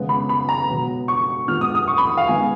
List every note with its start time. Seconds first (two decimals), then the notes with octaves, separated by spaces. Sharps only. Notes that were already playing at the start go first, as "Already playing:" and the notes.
Already playing: C#3 G#3 B3
0.09 B5
0.29 B5
0.49 A#5
0.69 B2 F#3 B3
1.08 C#6
1.48 A#2 G#3 B3 F6
1.61 D#6
1.75 D#6
1.88 C#6
1.98 B5
2.17 F5
2.27 D#3 G#3 B3 G#5